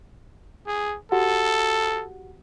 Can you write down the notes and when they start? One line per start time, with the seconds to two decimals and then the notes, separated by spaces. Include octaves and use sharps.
0.68 G#4
1.12 F#4 G4 A4 F#5